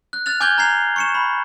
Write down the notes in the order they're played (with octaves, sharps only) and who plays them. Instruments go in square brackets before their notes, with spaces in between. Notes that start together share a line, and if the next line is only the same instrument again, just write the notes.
[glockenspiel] F#6
F6 F#6 A6 F7
G#5 D6 F6 G6 G#6 G7
A#5 F6 G#6 C7 F7
C#6 C#7 E7
B5